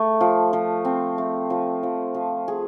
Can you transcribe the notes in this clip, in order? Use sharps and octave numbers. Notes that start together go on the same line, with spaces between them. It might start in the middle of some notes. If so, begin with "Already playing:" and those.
Already playing: A3
F3
F3
C4
A3
F3
F3
F3
G#4